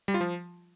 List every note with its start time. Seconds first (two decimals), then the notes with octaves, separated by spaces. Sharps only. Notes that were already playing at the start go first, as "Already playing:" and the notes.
0.08 G3
0.14 F4
0.20 F3